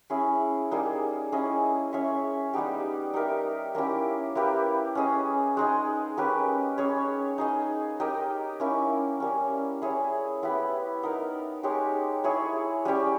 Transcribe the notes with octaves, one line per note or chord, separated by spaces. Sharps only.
C#4 E4 G#4
G3 A#3 D#4 G#4
C#4 E4 G#4 D#5
C#4 G#4 C#5 E5
G3 B3 D#4 G4
D#4 G4 A#4 E5
A#3 C#4 E4 G4
A#3 E4 G4 B4
C#4 G#4 D#5
G#3 D#4 G#4 D#5
A#3 C#4 G4 B4
C#4 G#4 C#5
D#4 G#4 D#5
D#4 G4 A#4 D#5
A#3 C#4 E4
G3 A#3 C#4
E4 G#4 C#5
B3 E4 G4 B4
B3 D#4 A#4
G#3 D#4 G4 C#5
E4 G#4 C#5
G3 C#4 G4 C#5